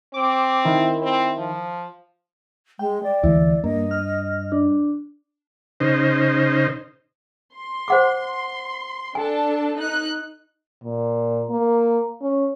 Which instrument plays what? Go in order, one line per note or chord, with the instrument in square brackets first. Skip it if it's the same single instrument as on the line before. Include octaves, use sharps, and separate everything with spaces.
[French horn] C4 [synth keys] D6
[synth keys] D#3 E4
[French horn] C4
F3
[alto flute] G#3 [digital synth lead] G5
[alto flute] D5
[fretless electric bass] D2 E3 G#3 [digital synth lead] E4
[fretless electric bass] G2 [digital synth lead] A#3 [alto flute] D#5
[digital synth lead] F6
D4
[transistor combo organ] C#3 D#4 C5
[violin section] C6
[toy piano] C5 F#5 D6
[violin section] D4 A4 A5 [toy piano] G#5
[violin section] D#4 F#6
[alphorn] A#2
A#3
C#4